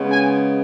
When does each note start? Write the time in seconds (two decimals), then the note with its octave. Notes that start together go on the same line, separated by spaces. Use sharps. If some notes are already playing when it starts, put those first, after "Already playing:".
Already playing: C#3 G#3 B3
0.09 G#5